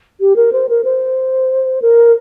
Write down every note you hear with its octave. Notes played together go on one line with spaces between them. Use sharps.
G4
A#4
C5
A#4
C5
A#4